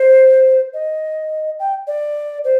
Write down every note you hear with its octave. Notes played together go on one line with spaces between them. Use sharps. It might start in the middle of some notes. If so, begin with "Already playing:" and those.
Already playing: C5
D#5
G5
D5
C5